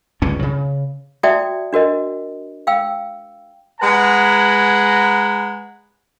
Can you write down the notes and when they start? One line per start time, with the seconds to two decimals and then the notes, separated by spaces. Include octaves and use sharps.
0.22 C#2 G2 D3 C#4
0.42 C#3
1.23 F#4 D5 E5 G5 A5 D#6
1.73 D4 F#4 A#4 D#5
2.67 F5 G5 E6
3.80 G#3 B4 F#5 G#5 A#5 B5